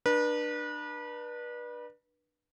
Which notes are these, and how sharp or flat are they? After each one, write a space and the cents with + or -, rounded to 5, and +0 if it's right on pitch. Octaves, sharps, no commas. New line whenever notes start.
D4 +30 B4 -30